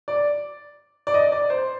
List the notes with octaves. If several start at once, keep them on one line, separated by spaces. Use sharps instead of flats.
D5
D5
D#5
D5
C5